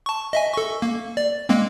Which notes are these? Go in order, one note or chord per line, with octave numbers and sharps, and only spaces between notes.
A5 C#6
D#5 E5 G#5
A4 C#6
A#3
D5
G#3 A#3 C4